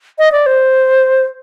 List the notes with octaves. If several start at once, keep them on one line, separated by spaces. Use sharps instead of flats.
D#5
D5
C5